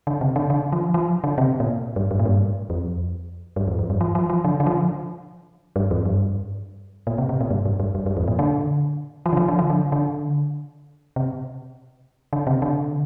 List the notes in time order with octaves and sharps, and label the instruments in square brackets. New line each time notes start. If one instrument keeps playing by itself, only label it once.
[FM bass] D3
C3
D3
D3
F3
F3
D3
C3
A#2
G2
G2
A#2
G2
F2
G2
F2
F2
G2
F3
F3
F3
D3
D3
F3
G2
F2
G2
A#2
C3
C3
A#2
G2
G2
G2
G2
G2
F2
A#2
D3
F3
D3
F3
D3
F3
D3
D3
C3
D3
C3
D3